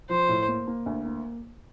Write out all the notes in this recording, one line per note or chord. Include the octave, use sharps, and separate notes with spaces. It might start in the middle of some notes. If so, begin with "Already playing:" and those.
F3 C5
A2
A#3
A#3
D2
A#3